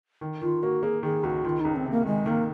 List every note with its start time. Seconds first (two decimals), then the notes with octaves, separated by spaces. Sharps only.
0.21 D#3
0.42 D#3 F4
0.63 A#3 F#4
0.83 A#3 G#4
1.03 D#3 G#4
1.23 C#2 F#4
1.45 D#3 F4
1.60 C#2 D#4
1.75 C4
1.86 C3 A#3
2.06 D#3 G#3
2.26 D#3 A#3